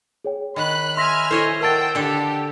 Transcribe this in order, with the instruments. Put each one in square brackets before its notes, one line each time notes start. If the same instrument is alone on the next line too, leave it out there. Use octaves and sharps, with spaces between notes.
[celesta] G#4 C#5 G5
[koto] D#3 [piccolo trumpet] B5 [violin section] F#6
[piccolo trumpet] E5 [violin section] G#5 F6 [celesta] C6 A#6 B6
[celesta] E4 A4 [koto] C5 C#5 D#5
[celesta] A#4 A5 A6 [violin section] F#5 G5 [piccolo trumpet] E6
[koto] D3 A4 [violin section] G4